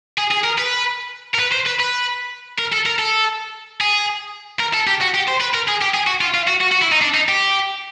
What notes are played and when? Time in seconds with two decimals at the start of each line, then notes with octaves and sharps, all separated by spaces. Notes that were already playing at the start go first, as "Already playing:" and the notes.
0.18 G#4
0.32 G#4
0.44 A#4
0.59 B4
1.34 A#4
1.39 B4
1.52 C5
1.66 B4
1.80 B4
2.59 A#4
2.73 A4
2.86 A#4
2.99 A4
3.80 G#4
4.60 A#4
4.74 A4
4.87 G4
5.01 F#4
5.14 G4
5.27 C5
5.40 B4
5.54 A#4
5.68 G#4
5.81 G4
5.94 G#4
6.07 F#4
6.21 F4
6.34 F4
6.47 F#4
6.61 F#4
6.72 F#4
6.82 E4
6.92 D#4
7.01 D4
7.14 D#4
7.28 G4